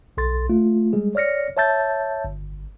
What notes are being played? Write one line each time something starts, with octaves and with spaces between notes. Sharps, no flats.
B1 A4 C6 A6
A3 F4
G3 G#3 G#4
C#5 D5 F6 A#6 C#7
C#5 E5 A5 E6 G6 A6
G1